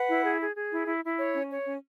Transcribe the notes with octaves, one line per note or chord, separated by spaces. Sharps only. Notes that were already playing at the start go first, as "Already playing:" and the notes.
Already playing: B4 F#5
E4
G#4
G#4
G#4
E4
E4
E4
C#5
C#4
C#5
C#4